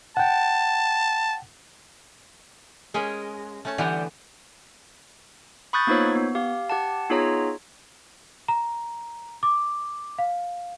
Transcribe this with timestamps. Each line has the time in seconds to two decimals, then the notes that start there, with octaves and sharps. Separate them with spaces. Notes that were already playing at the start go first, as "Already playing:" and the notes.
0.17 F#5 G5 A5
2.94 G#3 C#4 G#4 A#4
3.65 A3 C#4 A5
3.78 D3 E3 G3 B3 G4 F#5
5.73 B5 C#6 D#6 F#6 G6 A6
5.87 A#3 B3 D#4 F4 C5 C#5
6.16 B3
6.35 G4 F5
6.70 G4 F#5 A5
7.10 B3 D#4 F4 G#4 C#5 A#5
8.48 A#5
9.43 D6
10.19 F5